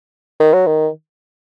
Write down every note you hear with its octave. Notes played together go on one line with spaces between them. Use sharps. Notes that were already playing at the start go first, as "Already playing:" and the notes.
D#3
F#3
D#3